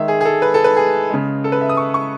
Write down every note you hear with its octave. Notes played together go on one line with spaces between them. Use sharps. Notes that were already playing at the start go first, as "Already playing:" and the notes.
Already playing: D#3 G#3 E5
G#4
G#4
A4
B4
A4
B4
G#4
C#3 G#3
A4
B4
E5
D#6
C#6
C#6